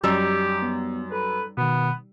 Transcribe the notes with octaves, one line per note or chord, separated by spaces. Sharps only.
F#2 G3 D#4 G4 E6
B3
A4 B4
B2 D#3 B3